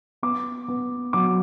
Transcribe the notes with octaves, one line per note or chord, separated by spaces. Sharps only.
B3 D6
B3
F#3 D6